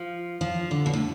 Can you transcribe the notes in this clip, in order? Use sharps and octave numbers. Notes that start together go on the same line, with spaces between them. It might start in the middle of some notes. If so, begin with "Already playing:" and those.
Already playing: F3
F3
D3
B2
A2